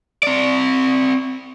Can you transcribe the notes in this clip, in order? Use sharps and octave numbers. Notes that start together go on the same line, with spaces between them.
C4 D5